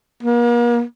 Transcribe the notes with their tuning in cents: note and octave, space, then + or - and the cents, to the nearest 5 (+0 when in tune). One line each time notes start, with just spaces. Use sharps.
A#3 +40